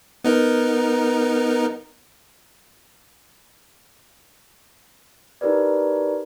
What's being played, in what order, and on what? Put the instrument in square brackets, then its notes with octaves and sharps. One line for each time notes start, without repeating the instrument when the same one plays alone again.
[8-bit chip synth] B3 D#4 A#4
[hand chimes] D#4 E4 G4 A#4 B4 D5